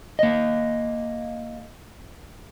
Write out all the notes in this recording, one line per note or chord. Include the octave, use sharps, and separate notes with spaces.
A#3 D#5